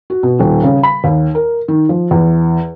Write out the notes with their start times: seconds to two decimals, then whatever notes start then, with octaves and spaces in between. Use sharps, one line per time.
0.10 F#4
0.23 B2
0.39 D#1
0.63 C#3
0.83 B5
1.04 D#2
1.35 A#4
1.68 D#3
1.89 F3
2.11 E2